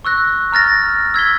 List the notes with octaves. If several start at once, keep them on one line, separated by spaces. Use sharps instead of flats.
C#6 E6 F#6 A#6
A#5 F6 A6 A#6
E6 G#6 B6 G7